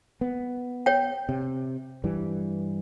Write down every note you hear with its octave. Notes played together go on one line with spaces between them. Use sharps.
B3
C#5 G5
C3
G2 E3 G3